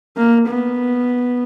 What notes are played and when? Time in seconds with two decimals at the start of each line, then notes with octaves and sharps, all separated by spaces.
0.17 A#3
0.48 B3